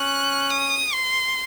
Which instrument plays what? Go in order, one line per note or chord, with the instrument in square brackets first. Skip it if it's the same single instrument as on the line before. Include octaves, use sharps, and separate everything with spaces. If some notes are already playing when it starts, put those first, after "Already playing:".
Already playing: [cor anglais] C#4 [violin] F#6
[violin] D#6
C6